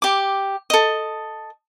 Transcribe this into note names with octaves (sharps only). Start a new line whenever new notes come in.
G4 D6
A4 D#5